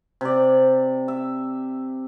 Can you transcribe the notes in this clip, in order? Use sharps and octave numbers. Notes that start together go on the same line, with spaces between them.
C3 D5
E5